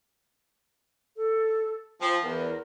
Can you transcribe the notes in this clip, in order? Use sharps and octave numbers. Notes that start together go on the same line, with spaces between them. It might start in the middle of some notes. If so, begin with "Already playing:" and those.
A4
F3 G5
E2 A#4